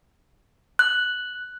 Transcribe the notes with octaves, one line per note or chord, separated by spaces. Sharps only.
F#6